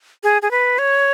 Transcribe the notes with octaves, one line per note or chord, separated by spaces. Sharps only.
G#4
G#4
B4
C#5